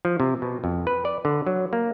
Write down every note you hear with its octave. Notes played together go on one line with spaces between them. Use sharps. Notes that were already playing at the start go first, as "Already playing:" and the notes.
F3
C3
B2
F2
B4
D5
D3
F#3
A#3